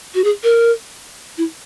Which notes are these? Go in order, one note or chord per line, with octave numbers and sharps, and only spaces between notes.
F#4
G#4
A#4
E4